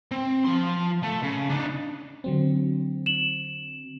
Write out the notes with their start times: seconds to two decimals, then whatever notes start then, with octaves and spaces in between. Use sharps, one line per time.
0.12 C4
0.46 F3 C6
1.03 A3
1.23 C#3
1.50 D4 D#4
2.24 D3 F#3 C4
3.06 E7 F#7